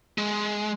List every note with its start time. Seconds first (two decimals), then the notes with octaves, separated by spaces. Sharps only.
0.18 G#3